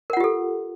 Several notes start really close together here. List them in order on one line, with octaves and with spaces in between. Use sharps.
A#4 F#5 F4 G4 A4